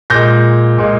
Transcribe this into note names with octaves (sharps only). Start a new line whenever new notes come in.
A#2 G#3 G6 A#6
A#2 G#3